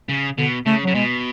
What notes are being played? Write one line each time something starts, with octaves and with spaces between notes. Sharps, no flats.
C#3
B2 D3
C#3 A3
C#3 F#3
B2 G#3